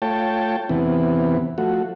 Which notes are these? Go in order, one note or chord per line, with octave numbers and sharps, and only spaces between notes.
A3 F4 C#5 G5 A5
E2 C3 E3 B3
F3 A3 F#4